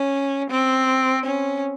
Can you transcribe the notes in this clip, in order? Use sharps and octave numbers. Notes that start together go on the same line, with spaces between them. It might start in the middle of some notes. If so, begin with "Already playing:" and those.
Already playing: C#4
C4
C#4